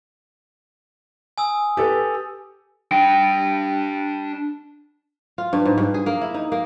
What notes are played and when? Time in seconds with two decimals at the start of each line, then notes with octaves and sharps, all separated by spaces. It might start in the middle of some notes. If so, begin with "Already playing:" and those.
1.38 G#5 D#6 E6
1.77 G4 A4 B4
2.91 D4 G5
5.38 F4
5.53 G2
5.66 G#2
5.78 G2
5.94 G#4
6.06 A#3
6.21 E4
6.34 D#4
6.52 A#3